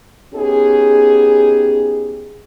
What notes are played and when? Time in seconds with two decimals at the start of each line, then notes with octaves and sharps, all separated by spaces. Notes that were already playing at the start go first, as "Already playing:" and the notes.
0.34 B3 C#4 D#4 G4 G#4